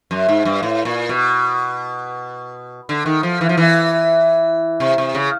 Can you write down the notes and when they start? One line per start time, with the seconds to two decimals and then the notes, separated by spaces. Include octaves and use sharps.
0.11 F#2
0.29 G#2
0.45 G2
0.63 A2
0.85 A#2
1.09 B2
2.89 D3
3.06 D#3
3.23 F3
3.41 E3
3.49 F3
3.57 E3
4.80 C3
4.98 C3
5.15 C#3